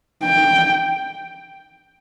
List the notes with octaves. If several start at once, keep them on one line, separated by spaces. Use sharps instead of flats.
G5